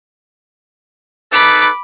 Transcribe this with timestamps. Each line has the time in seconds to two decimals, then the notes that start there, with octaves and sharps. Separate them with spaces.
1.32 D#4 A4 B4 B5 D6